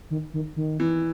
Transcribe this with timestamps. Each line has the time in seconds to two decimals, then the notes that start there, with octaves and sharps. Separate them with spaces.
0.10 D#3
0.34 D#3
0.56 D#3
0.80 E3